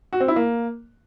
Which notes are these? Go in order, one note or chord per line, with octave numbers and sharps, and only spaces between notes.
F#4
C4
E4
A#3